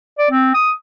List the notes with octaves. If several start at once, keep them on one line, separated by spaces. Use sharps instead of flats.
D5
C4
D#6